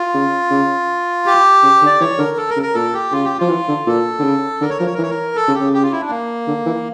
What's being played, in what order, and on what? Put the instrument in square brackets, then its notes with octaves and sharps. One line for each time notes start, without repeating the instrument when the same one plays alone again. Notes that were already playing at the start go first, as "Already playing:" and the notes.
Already playing: [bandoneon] F4
[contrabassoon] C#3
C#3
[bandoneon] G4
[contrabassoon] C#3
D3
[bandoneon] D5
[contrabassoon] E3 [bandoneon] C#5
[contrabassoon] D3 [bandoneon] A#4
[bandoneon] A4
A#4
[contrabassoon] C#3
[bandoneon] A#4
[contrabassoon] A#2 [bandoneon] A4
[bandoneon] G4
[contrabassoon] C#3 [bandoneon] F4
[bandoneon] G4
[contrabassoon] F3 [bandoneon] F4
[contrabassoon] E3
D3
[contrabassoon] A#2 [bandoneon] A4
[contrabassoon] D3
C#3
[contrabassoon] D3 [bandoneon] A#4
[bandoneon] C#5
[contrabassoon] F3 [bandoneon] A#4
[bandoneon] C#5
A#4
[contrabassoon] E3 [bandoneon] C#5
[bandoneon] A#4
A4
[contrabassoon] C#3
[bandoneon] G4
[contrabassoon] C#3
[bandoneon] G4
F4
E4
D4
A#3
[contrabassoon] D3
E3